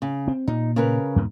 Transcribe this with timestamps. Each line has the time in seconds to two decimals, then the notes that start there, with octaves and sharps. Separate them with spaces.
0.02 C#3
0.28 C4
0.48 A#2 D#4
0.76 C#3 A#4 B4
1.16 E2 G#2 B2